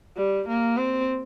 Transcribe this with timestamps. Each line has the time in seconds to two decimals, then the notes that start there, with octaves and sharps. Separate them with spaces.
0.17 G3
0.48 A#3
0.78 C4